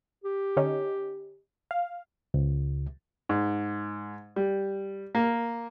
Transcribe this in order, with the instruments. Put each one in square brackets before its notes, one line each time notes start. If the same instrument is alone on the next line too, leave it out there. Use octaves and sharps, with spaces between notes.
[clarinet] G4
[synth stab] D3 C#4 D#4
F5
[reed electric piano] C#2
[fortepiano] G#2
G3
A#3